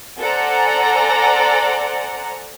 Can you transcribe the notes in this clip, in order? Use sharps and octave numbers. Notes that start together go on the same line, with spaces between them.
A4 C5 D5 F#5 G#5 A#5